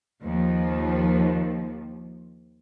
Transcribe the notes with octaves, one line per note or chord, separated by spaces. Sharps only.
D#2 F3